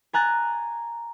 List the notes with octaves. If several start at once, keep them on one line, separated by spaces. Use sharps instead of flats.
G#5 A#5 F#6 A6